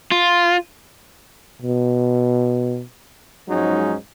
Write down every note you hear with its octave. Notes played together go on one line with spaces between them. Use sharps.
F4
B2
G#2 F3 F#3 G#3 C#4 D#4